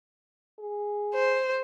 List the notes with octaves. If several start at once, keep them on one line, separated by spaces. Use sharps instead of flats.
G#4
C5